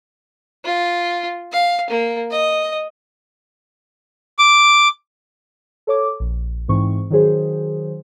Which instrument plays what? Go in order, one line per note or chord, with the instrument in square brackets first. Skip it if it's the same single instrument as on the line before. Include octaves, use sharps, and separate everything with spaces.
[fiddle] F4
F5
A#3
D#5
[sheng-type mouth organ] D6
[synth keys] A4 C#5 D6
A#1
G#2 E3 C4 C#6
D#3 F#3 G#4 C5